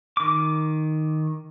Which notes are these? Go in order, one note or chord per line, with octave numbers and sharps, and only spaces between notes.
D#3 D6